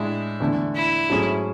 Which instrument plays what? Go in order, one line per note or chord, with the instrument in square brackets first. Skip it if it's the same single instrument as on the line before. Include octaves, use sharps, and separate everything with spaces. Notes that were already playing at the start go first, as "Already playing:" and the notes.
Already playing: [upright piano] A2 G#3 D4 G#4 [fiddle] E4
[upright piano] E2 D3 A3
[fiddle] E4
[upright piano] G#2 F#3 A3 C#4 G#4